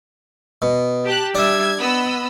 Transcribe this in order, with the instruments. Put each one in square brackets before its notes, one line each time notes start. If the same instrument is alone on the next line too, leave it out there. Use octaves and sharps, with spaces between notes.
[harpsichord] B2
[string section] G4 A5 F#6
[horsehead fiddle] G3 E5 [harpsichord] D4 [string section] G#6
[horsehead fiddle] B3 [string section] D#5 B5 E6